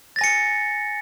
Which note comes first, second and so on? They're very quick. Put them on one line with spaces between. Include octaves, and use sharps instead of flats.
A6 A#6 G#5 C#7